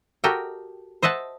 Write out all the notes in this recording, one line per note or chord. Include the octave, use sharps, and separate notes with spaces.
F#4 G4 A4 A#4 D#5 G5
C5 D#5 E5 F#5 A5